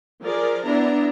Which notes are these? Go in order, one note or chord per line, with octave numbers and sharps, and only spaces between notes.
F3 G#4 A#4 D5
B3 D4 E4 A#5